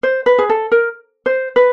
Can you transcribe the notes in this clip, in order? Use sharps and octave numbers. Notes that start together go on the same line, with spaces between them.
C5
B4
G#4
A4
A#4
C5
B4